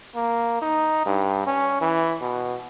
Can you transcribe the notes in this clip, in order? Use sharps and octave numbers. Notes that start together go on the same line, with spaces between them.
A#3
D#4
G2
C#4
E3
B2